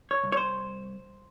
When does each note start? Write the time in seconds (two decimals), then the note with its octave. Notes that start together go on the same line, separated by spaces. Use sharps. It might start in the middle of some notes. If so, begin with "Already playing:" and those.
0.11 C#5
0.23 C2
0.32 C#5
0.37 C5